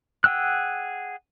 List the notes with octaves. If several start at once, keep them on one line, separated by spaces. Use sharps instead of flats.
G#4 F#5 G5 E6 F#6